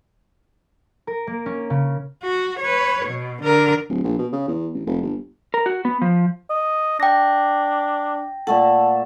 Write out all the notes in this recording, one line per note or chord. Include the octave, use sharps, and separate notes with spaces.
A#4
A#3
C#4
C#3
F#4
B4 C#5
B2
D3 A#4
D1
A#1
B2
C#3
E2
A1
F1
G1
A#4
F#4
B3
F3
D#5
D4 G5 A#6
A#2 A3 A4 F#5 A5